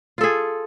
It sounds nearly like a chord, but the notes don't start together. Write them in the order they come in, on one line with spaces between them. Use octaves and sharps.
F4 A4 G#4